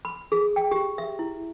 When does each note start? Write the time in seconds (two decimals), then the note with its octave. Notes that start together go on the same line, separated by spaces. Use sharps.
0.05 B5
0.32 G#4
0.56 G5
0.71 G4
0.98 E5
1.19 E4